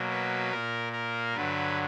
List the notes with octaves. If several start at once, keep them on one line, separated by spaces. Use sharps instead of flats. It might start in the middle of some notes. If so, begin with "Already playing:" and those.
Already playing: B2 F#3 A#3
B4
A#2 A#3 A#4
A#4
G2 D3 F#3 B4